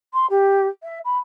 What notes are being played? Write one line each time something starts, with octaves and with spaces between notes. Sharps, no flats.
C6
G4
E5
B5